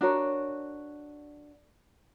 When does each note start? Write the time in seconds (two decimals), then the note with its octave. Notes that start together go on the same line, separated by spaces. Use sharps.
0.01 D4 F#4 A#4 C#5